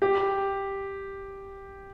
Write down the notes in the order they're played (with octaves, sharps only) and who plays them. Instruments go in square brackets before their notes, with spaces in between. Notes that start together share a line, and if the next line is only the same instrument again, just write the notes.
[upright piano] G4